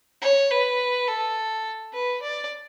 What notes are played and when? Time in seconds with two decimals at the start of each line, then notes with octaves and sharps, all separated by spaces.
0.22 C#5
0.51 B4
1.08 A4
1.93 B4
2.22 D5